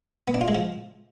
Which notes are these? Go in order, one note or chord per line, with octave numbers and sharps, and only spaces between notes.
B3
D4
F4
G#3
F3